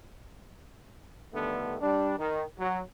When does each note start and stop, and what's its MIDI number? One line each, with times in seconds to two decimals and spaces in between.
1.34 1.76 43
1.34 1.76 50
1.34 1.76 51
1.34 1.76 57
1.34 1.76 59
1.81 2.13 55
1.81 2.13 62
2.18 2.43 51
2.59 2.80 54